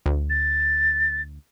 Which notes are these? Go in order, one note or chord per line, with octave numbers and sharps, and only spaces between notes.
D2
A6